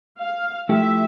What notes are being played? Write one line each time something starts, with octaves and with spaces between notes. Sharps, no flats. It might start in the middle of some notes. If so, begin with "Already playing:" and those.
F5
F3 A3 E4 G4 E5